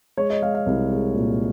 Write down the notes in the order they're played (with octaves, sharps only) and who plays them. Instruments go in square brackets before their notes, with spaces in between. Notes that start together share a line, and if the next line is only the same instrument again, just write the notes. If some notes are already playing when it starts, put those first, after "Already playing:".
[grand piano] G#3 C#5
D#5
G#3 F5
F5
C2
G#3
A#2